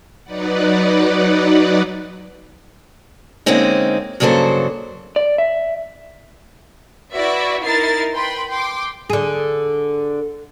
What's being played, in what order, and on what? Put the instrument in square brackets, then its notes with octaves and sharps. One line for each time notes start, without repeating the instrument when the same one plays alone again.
[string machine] F#3 D#4 B4 D5 F#5
[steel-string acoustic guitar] D3 G#3 A#3 C4 C#4 D#4
G2 C#3 F#3 A#3 A4 C5
[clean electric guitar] D5
E5
[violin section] E4 F#4 B4 D5 E5
D#4 E4 A#4 A6 C7
B4 G5 B5 C6
G5 C6 D6
[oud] D3 G#4